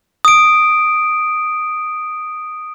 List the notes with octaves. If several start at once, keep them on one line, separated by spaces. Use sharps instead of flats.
D#6 D7